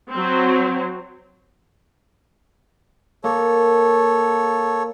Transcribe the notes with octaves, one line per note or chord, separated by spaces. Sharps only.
F#3 C4
A#3 A4 C#5